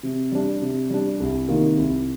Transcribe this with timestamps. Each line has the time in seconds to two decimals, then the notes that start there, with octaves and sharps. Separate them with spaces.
0.03 C3
0.32 G3 D4
0.61 C3
0.90 G3 D4
1.20 C2
1.48 C3 D#3 A#3 F4
1.78 C2